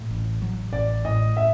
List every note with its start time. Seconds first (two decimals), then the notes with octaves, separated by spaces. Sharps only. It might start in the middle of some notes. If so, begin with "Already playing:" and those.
Already playing: A2
0.11 A1
0.42 F#3
0.73 A1 D5
1.05 A2 D#5
1.37 E5